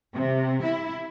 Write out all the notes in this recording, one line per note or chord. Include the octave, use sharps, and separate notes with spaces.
C3
E4